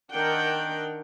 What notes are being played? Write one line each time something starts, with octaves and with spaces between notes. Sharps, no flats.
D#3 D4 A#4 F#5 G5